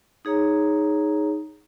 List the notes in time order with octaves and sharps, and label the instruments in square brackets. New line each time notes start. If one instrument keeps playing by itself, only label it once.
[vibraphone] D#4 G#4 C#5 A#5